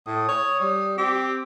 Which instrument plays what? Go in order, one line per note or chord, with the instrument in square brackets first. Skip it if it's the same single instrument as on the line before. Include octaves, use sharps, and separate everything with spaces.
[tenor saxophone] A2 [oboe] D#6
[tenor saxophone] C#5
G3
[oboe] C4 [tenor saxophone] G4